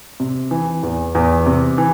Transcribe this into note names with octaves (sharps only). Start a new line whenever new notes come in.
C3
E3
E2
E2
C3
E3